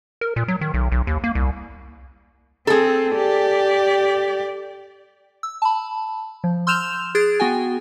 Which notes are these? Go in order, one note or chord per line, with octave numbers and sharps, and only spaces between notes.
A#4
A#2
F#3
D#3
B1
B1
D#2
A#3
C2
C4 G#4 A4
G4 D5
E6
A5 B5
F3
C6 E6 F6 G6 E7 F7
G#4 F#6 G#6 A6 D7
B3 F#4 G5 G#5